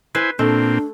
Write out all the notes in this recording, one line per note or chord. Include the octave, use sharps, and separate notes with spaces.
E4 B4 C5 G#5
A#2 A3 C4 D4